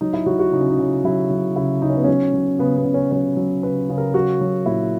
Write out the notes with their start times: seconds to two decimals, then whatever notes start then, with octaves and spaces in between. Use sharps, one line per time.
0.01 F#3 D#4
0.13 E4
0.26 F#3 F#4
0.39 F#4
0.52 C#3 D#4
0.61 C#4
0.70 D#4
0.79 C#3
1.04 F#3 E4
1.31 F#3
1.56 C#3 E4
1.82 C#3 D#4
1.90 C#4
1.97 B3
2.04 F#3 C#4
2.34 F#3
2.59 C#3 B3
2.77 B3
2.85 C#3
2.94 C#4
3.12 F#3 C#4
3.37 F#3
3.63 C#3 B4
3.89 C#3
3.98 A#4
4.14 F#3 F#4
4.41 F#3
4.66 A#2 E4